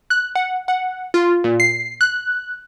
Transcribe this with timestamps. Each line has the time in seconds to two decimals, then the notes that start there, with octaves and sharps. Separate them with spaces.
0.10 F#6
0.35 F#5
0.68 F#5
1.14 F4
1.44 A#2
1.60 C7
2.01 F#6